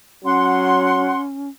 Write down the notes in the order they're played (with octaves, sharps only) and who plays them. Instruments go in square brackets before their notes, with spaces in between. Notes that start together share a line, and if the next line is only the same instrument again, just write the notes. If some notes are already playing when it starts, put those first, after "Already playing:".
[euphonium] F#3 [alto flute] C#4 [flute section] F#5 C6